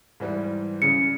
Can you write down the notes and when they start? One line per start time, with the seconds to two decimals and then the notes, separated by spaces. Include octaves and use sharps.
0.20 G#2 E3 G3
0.82 C#3 C#7